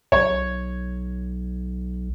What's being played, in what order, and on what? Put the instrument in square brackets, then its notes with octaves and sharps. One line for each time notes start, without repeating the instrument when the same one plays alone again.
[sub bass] B1 [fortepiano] C#5